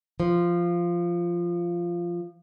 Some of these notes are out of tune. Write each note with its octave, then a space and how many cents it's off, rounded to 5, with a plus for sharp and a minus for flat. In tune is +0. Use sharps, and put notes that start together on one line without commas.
F3 -10